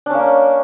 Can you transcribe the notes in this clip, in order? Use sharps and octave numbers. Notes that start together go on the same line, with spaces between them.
A#3 C#4 D4